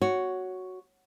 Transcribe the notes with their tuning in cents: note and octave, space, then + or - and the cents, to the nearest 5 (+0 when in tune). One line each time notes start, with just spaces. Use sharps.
F#4 +0 C#5 +5